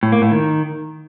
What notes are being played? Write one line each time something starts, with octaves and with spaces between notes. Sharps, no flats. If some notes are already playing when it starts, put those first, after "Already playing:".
A2
A#3
A2
D#3